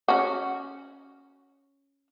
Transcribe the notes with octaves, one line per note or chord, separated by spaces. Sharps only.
C#4 F#4